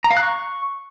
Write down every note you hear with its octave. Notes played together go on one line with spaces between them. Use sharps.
A#5
F5
F#6
C#6